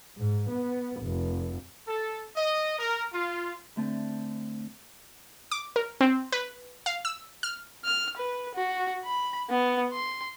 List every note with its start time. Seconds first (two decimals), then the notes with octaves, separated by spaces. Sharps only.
0.18 G#2
0.50 B3
1.01 F1
1.88 A4
2.37 D#5
2.79 A#4
3.12 F4
3.76 D3 A3 C4 A5
5.51 D6
5.76 A#4
6.01 C4
6.32 B4
6.86 F5
7.05 E6
7.43 F6
7.84 F6
8.17 B4
8.55 F#4
9.04 B5
9.49 B3
9.92 C6